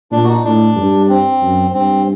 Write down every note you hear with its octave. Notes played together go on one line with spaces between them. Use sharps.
A#2 D4
F#4
D#4
A2 D4
G2
C4
F#2
G2 C4